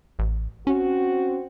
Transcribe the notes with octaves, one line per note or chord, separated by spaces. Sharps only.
A1
C4 C#4 F#4